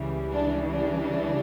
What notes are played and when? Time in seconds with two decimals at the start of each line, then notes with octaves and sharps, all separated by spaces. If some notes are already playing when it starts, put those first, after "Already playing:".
Already playing: C#2 C#3 E3 G3
0.32 D4
0.71 D4